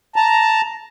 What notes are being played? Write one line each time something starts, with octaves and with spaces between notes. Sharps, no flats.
A5 A#5